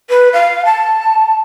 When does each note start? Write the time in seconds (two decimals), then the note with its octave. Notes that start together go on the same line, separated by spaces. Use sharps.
0.10 B4
0.33 F5
0.65 A5